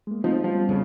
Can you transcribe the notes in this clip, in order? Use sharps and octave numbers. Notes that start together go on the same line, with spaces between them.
G#3 A#3
F3 A3 C4 D#4
F3 G3 B3 C#4
F2 C#3 F3